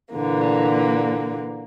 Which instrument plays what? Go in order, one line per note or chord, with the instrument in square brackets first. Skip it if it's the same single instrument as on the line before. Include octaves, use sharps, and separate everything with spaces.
[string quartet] A#2 D3 E3 A#3